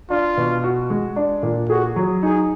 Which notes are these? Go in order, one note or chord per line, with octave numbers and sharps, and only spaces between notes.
D4 F4
B2
F#4
G#3
D4
A#2
F#4 G#4
F#3
D#4 G#4